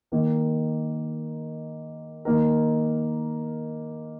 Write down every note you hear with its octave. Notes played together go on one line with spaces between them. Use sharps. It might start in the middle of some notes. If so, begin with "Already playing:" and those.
D#3 A#3 D#4
D#3 A#3 D#4 A#4